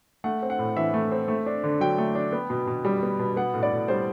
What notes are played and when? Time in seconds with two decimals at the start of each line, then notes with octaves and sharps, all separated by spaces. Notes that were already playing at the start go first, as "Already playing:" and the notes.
0.24 A3 F#5
0.42 C4
0.50 F#5
0.59 A2
0.77 E3 E5
0.94 A3
1.11 C4
1.28 A3
1.46 D4
1.64 D3
1.80 F#3 G5
1.98 A3
2.15 D4
2.33 B3
2.50 B2
2.67 B2
2.85 G3
3.03 B3
3.19 B2
3.36 B3 F#5
3.54 A2
3.63 D5
3.72 A2
3.88 G3 C5